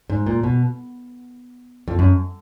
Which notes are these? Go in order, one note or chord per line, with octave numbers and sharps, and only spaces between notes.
G#2
A#2
B2
F2
F#2